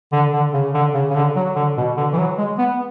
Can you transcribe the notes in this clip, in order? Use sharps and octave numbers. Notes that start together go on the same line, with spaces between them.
D3
D3
C#3
D3
C#3
C#3
D3
F#3
D3
B2
D3
E3
F#3
G#3
B3